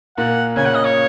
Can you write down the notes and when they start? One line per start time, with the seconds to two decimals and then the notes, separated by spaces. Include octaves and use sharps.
0.17 A#2 A#3 F#5
0.56 C#3 C#4 G#5
0.66 F#5
0.75 D#5
0.85 C#5